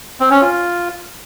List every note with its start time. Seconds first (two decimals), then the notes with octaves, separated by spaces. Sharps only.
0.20 C4
0.31 C#4
0.42 F4